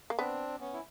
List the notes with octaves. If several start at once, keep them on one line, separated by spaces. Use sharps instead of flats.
A#3
B3 C4 D4
B3 C#4
E4